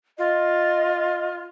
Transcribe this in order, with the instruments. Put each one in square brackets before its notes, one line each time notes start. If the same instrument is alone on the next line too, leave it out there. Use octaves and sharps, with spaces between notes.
[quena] F4 [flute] D#5